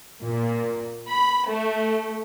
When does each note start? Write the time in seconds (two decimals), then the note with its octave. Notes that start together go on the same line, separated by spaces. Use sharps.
0.24 A#2
1.08 B5
1.48 A3